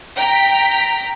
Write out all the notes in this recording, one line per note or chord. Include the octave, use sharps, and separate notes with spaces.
G5 A#5 B6